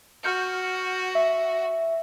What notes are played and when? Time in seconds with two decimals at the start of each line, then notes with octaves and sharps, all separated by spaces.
0.24 F#4 F6 G6 C#7
1.15 E5